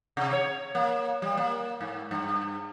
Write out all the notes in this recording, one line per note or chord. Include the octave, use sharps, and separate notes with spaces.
C3
C#5
A#3
G3
A#3
G#2
G2